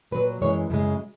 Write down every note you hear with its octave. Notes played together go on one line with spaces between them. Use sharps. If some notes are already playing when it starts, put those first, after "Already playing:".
A#2 F#3 B4
F#2 E3 G#3 C#5
F#2 C#3 G#3